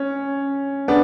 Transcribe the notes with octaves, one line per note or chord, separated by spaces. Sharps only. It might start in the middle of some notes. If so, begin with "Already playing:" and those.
Already playing: C#4
B3 D4